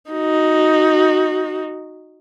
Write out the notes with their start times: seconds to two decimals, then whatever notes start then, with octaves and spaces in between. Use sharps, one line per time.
0.11 D#4 F#4